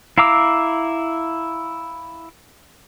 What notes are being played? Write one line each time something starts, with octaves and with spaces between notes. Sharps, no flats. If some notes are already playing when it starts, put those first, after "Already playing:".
E4 F5 A#5 D6 E6